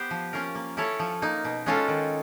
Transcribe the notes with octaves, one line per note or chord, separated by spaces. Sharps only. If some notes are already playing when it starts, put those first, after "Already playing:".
Already playing: B3 G4 C5
F3
A#3 C#4 F4 A#4
A#3
C#4 E4 A4 C#5
F3
A#3 D#4
B2
G#3 C#4 F4 A4
D#3